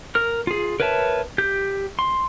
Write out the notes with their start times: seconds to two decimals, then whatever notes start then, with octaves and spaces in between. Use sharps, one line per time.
0.15 A#4 F6
0.47 F4 G#4
0.80 A#4 B4 C#5 E5 A5
1.38 G4 G6
1.99 C6